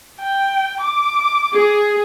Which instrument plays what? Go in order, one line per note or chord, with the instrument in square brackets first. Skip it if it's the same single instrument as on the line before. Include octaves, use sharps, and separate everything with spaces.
[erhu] G5
D6
[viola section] G#4